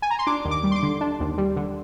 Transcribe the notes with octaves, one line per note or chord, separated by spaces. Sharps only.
G#5
A#5
C6
D4 D6
D#2
D6
G3
C6
D6
D3
D4
D#2
G3
D3